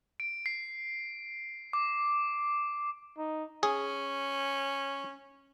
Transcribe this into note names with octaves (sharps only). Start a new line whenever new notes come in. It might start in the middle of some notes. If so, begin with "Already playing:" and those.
D7
C7
D6
D#4
C#4 G#4